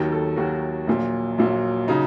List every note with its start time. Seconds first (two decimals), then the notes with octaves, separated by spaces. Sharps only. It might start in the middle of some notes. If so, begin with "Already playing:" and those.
Already playing: D#2 D#3 F#3
0.12 A4
0.36 D#2 D#3 F#3 F#4
0.87 A#1 A#2 F#3
1.38 A#1 A#2 F#3
1.88 C#3 F#3 D#4